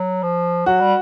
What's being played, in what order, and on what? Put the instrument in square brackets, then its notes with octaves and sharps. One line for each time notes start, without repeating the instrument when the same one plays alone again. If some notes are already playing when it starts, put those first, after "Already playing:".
Already playing: [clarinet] F#3
F3
[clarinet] F#3 [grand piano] F#4
[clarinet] G3